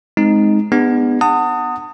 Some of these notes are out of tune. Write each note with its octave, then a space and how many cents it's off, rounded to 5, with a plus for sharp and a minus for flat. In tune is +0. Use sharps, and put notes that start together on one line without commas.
G#3 +15 C4 +0 D#4 +0
B3 +0 D4 +35 G#4 -45
F#5 +0 A5 +40 D#6 +0